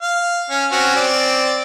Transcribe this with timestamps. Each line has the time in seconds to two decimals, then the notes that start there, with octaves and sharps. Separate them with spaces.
0.02 F5
0.50 C#4
0.72 C4 C#4 F#4
0.96 C4 D5